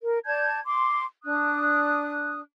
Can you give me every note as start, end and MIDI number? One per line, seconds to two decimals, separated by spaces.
0.01 0.18 70
0.26 0.59 74
0.26 0.59 81
0.26 0.59 91
0.26 0.59 92
0.65 1.05 84
0.65 1.05 86
1.25 2.40 62
1.25 2.40 87
1.25 2.40 90